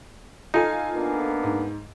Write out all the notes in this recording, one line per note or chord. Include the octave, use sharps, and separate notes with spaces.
D#4 F4 A4 G#5
A#3 B3 D4
G#2